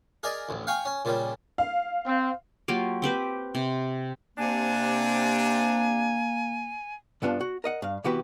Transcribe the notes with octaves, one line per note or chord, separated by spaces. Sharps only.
G#4 A#4 D5 D#5
A1 D2
F5 G5 G#5 C#6
C#4
A#2 C#3 G3
F5
C4
F#3 A#3 F4 G4
C4 G4 B4 C5
C3
C3 A#3 D4 G#5
C2 G2 B3 D4 F4 A5
F#4
A#4 D#5 F#5
G2 F5
C3 E3 B3 F#4 G4 B4